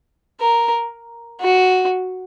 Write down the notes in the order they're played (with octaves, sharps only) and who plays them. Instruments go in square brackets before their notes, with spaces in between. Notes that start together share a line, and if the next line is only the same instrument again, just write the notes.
[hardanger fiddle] A#4
F#4